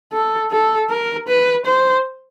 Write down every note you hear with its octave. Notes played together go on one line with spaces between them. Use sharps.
A4
A4
A#4
B4
C5